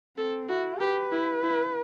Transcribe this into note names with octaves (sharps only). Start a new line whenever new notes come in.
C4 A4
E4 F#4
G4 B4
E4
E4